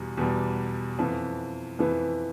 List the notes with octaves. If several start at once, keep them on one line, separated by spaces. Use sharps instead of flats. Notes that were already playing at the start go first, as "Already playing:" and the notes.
Already playing: E2 B2 G3
E2 B2 G3
F2 E3 B3
F2 E3 B3